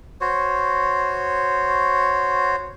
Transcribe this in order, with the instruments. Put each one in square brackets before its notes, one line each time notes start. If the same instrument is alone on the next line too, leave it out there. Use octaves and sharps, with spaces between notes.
[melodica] F#4 C5 C#5